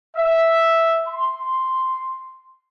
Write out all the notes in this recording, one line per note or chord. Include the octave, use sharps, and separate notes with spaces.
E5
C6